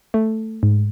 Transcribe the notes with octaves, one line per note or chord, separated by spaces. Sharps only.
A3
G#2